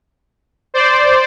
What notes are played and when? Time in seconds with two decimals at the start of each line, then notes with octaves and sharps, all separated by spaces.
0.74 C5 D5